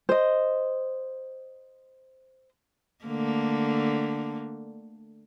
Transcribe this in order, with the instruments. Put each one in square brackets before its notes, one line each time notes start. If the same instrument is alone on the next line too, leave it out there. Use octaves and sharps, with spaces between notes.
[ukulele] C5 D#5
[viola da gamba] D3 A3 A#3